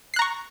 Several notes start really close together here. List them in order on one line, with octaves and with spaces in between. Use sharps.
C7 F#6 A#5 C#6